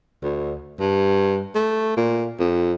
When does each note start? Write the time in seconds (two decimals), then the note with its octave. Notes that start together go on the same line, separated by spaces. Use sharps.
0.23 D2
0.79 G2
1.55 A3
1.96 A#2
2.39 F2